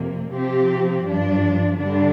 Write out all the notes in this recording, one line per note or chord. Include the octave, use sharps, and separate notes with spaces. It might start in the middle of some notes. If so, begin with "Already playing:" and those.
Already playing: F2 C3 A#3
C3 F3 C4 G4
G2 F3 D4
G2 D3 G3 D4